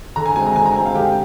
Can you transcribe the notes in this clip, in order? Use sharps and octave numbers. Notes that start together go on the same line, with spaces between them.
D3 A#5
G#5
G#3 C4 G#5
A#5
D3 G#5
A#5
G#3 C4 G#5
F5
D3 G4